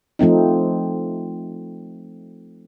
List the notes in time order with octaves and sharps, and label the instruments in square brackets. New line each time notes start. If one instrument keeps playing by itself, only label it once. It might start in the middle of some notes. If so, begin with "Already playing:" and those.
[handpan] F3 A3 C4 D#4